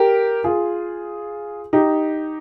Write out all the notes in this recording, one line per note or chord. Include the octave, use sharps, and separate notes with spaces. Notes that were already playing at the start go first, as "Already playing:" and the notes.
Already playing: G4 A#4
F4 G#4
D#4 G4